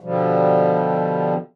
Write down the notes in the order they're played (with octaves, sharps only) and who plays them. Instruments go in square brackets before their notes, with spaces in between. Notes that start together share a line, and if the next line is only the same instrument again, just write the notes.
[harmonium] B2 D3 F3 G3